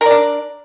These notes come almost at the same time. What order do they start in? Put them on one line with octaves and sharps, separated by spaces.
A#4 D5 D4